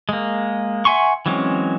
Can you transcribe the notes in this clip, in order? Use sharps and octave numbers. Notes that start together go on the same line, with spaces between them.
G#3 A#3
E5 F#5 G#5 C6 C#6
E3 F#3 G#3 C4 C#4